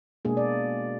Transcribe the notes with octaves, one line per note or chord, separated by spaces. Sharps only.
B2 G#3 A#3 D4 G#4
D5